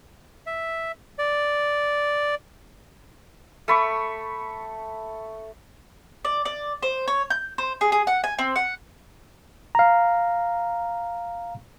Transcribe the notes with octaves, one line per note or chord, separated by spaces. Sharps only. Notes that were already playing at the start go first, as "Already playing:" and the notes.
E5
D5
A3 B5 C#6
D5
D5
C5
C#5
G6
C5
G#4
G#4
F#5
G#5
C4
F#5
F5 A#5